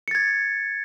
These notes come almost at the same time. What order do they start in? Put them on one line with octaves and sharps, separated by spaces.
C#7 A6 G#6